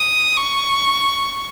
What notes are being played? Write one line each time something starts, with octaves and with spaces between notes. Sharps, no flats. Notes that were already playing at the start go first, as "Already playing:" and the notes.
Already playing: D#6
C#6